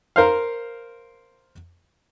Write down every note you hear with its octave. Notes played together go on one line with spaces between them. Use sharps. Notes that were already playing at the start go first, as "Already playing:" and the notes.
A#4 C5 F5